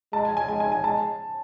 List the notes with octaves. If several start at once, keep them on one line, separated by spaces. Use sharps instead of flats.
G#3 A5
G#5
G#5
G#3 G#5
G#5
G#5
G#3 A5